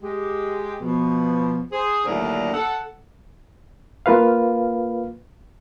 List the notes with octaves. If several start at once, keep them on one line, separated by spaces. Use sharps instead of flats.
G#3 G4
B2 F3
G#4 C5
D#2 A2 D3 F#3 D4 A#4
A4 F#5
A#3 F4 B4 F5